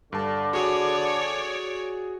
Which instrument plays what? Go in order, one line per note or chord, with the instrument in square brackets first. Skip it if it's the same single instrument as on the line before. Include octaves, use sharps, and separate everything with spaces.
[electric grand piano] G2 A5 [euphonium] D3 [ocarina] D6
[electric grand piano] F#4 G#4 [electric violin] C#5 D5